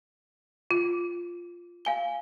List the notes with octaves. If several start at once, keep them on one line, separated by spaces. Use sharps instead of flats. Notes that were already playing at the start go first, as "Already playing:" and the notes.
F4
F5 G#5 G7